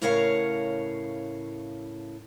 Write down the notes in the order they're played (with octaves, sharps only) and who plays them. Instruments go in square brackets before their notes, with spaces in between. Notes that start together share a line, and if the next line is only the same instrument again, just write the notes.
[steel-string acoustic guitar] A2 C#3 A#4 C#5 F5 F#5